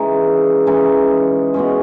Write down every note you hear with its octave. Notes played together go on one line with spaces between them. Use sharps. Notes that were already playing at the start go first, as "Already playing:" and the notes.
Already playing: C#3 E3 G#3 D#4
C#3 E3 G#3 D#4
B2 G#3 C#4